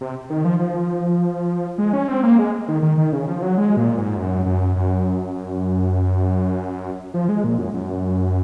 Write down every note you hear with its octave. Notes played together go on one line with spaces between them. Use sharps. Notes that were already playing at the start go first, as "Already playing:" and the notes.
C3
D#3
F3
F3
G#3
C#4
C4
A#3
G#3
D#3
D#3
D#3
C#3
F3
F#3
G#3
A#2
G#2
F#2
F#2
F#2
F3
G#3
A#2
F#2
F#2